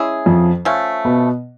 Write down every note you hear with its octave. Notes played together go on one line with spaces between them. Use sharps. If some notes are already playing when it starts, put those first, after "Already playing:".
Already playing: G#3 C#4 E4 G#4
F2 F3
F3 A3 C#4
B2 B3